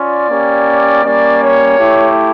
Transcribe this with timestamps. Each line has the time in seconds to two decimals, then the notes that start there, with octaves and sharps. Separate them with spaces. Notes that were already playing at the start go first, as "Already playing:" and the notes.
Already playing: C#4 F4 D5
0.29 A#3 C#4 G4
1.03 G3 A#3 C#4 D5
1.42 C#5
1.78 A3 E4 G4